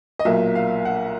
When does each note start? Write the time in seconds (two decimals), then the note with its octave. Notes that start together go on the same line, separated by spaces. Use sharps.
0.19 D#5
0.25 B1 A#2 F#3 A#3 E5
0.55 F5
0.85 F#5